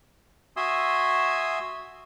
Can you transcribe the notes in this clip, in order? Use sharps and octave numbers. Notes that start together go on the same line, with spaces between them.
F#4 E5 G#5 C6 D#6 E6